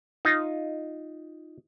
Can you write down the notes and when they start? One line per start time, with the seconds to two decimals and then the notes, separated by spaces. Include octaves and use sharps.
0.25 D#4 F4